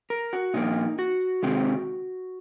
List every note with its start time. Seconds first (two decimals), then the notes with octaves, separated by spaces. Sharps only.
0.10 A#4
0.33 F#4
0.54 A#2 F3 A#3 D#4
0.99 F#4
1.43 C3 D#3 G#3 C4